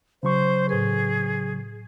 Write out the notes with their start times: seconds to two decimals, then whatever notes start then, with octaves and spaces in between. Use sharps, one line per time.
0.23 C#3 F#3 C5 C#6
0.69 A2 G#4 B4